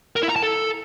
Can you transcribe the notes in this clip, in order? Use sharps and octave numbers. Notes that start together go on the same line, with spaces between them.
A#4
E4
A#5
A5
A4